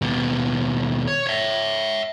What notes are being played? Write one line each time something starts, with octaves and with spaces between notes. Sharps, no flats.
D#2 B2
C#5
C#5 E5